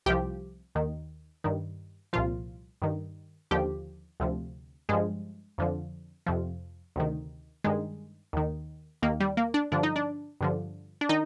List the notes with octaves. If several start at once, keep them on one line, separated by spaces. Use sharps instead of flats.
C2 C3 F3 G4
D#2 D#3
G2 D#3
C2 A#2 F3 F4
G2 D#3
D#2 D3 F3 G4
D2 C3 F3
G2 F3 G#3
F2 D3 F3
F2 C3 F3
D2 C3 D#3
G2 D#3 G#3
D#2 D#3
D#2 D#3 A#3
G3
A#3
D4
G2 D3 F3 D4
D#4
D4
G2 D3 F3
D4
D#3 D#4